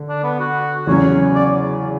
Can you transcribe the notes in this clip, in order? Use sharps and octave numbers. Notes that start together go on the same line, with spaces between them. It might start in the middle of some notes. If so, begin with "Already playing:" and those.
Already playing: D3
D4
B3
F#4
E2 C#3 F#3 C#4 C#5
D5